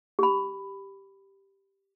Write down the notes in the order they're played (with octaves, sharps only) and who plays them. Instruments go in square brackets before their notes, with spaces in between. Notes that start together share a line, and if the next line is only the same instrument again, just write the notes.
[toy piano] G4 B5